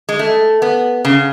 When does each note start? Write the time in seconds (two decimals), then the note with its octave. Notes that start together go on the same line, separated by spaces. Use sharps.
0.09 G#3
0.19 A3
0.62 B3
1.05 C#3